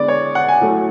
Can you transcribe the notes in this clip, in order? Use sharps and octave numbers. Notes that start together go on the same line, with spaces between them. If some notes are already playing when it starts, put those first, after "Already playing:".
Already playing: D3 G#3 B3 D5
C#5
F#5
G#5
A2 F#3 A3